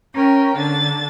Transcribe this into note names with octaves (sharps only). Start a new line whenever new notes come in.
C#4 A#4 G5
D3 D4 A6